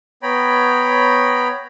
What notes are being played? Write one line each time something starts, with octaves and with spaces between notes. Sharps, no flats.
B3 C#5 G5 A#5 B5